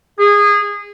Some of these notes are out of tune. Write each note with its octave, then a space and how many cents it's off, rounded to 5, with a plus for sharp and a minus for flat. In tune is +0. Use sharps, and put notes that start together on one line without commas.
G#4 -20